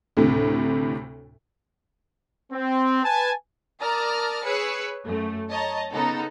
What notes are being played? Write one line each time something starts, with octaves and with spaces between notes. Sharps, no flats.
D2 A2 C3
C4
B4 G#5 A5
A#4 D5 A5 A#5 D#6 F6
G#4 B4 C#5 E6 F#6 C#7
F#2 A3
C#5 D#5 A5 A#5
C#3 B3 D#4 A4